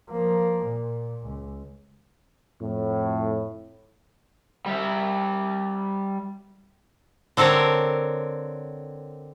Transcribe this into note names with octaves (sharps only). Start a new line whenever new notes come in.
F3 A#3
A#2
C#2
F2 A2
G3 E5
D3 C4 A4 A#4 C#5